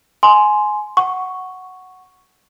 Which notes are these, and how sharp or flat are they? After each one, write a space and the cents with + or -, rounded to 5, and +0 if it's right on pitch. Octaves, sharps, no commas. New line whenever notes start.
G#5 +15 C6 +0
F#5 +0 C#6 +0